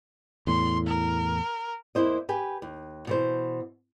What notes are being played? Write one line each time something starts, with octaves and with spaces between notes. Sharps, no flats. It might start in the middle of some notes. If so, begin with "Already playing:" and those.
E2 A2 C6
A#4
E2 A#3 E4 C5 D#5
G4 B4 G#5
D#2
B2 E3 C5